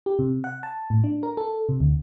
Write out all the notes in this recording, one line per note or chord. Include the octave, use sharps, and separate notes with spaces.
G4
C3
F#5
A5
A2
D4
A#4
A4
C3
D2